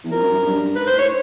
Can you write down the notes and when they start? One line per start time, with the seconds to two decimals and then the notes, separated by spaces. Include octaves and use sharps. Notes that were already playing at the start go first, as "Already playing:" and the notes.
0.04 E2
0.12 F2 A#4
0.22 F#2
0.33 F#2
0.44 G2
0.76 G#2 B4
0.87 C5
0.93 A2
0.98 C#5